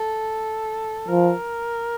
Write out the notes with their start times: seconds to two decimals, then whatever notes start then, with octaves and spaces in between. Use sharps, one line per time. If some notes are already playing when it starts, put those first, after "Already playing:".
Already playing: A4
1.08 F3 A#4